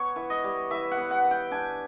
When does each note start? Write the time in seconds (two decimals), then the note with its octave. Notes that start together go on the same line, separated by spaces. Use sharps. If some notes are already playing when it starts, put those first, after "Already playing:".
Already playing: B3 C#5
0.16 E3
0.30 D#5
0.44 G3
0.71 E3 E5
0.91 F#5
0.97 B3
1.11 F#5
1.25 E3
1.31 G5
1.51 D4 G#5